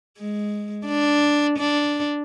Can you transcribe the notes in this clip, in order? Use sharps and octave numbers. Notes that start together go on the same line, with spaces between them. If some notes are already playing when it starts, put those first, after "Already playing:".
G#3
D4
D4